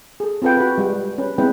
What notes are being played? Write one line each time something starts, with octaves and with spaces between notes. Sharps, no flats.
G#4 A4
C4 F4 A4 B4 G5
F#4 B4
G3 G#3
C#4 B4
G#3 B3 C4 E4 B4 G5